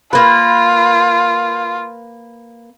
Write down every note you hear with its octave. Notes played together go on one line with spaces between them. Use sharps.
A#3 F4 B4